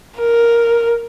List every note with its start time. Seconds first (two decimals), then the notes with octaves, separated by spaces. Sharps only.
0.19 A#4